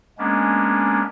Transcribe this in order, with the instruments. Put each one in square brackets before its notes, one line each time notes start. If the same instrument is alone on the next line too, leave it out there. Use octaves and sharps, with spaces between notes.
[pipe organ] G#3 A#3 B3 C#4 D4